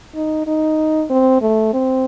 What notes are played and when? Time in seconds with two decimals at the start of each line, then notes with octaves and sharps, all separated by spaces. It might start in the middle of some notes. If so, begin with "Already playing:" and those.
0.15 D#4
0.47 D#4
1.10 C4
1.42 A3
1.73 C4